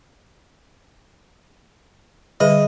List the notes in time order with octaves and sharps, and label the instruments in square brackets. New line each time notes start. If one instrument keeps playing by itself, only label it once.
[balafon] D3 G3 G#4 [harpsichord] D#5